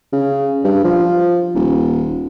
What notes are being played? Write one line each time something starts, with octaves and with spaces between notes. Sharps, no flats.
C#3
G2
F3
D#1